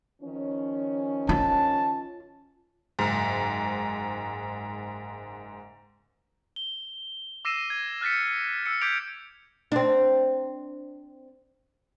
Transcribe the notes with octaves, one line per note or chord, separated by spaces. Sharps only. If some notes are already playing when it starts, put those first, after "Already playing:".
D#3 F3 C#4
F4 A5
F#1 G#2
G7
D6 E6 A#6 C7 D#7 E7
G#6
F6 F#6 A6 B6 C#7
E6 C#7
D6 G6 G#6 B6 D7 F7
C4 D4